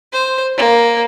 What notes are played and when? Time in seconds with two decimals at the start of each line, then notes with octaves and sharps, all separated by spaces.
0.13 C5
0.57 A#3